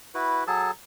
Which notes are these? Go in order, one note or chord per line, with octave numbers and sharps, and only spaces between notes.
E4 F#4 B4
F#3 G#4 A4 A5